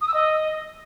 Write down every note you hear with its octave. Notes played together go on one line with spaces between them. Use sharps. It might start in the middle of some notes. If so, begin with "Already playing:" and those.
D#6
E6
D#5